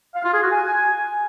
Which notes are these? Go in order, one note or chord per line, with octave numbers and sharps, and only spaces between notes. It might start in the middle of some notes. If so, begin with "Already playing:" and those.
F5
F4
G#4
F#4
G#5